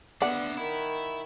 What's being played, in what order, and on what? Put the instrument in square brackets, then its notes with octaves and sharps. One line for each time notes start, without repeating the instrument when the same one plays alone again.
[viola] B3 [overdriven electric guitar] D4 E5 [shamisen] D5 [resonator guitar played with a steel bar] F#5
[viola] D#3 [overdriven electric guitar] E4